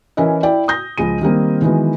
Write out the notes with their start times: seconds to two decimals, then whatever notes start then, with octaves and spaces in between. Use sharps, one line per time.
0.17 E3 C#4 E4 A#4 D#5
0.43 E4 D5 G5
0.68 D#6 G6 A#6
0.98 C#2 F3 G#3 D#7
1.21 D#3 G3 A#3 C4
1.62 D#3 E3 F#3 G#3 B3